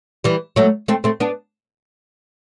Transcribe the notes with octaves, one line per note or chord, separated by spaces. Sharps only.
E3 G3
F#3 A3
A3 C4
A3 C4
B3 D4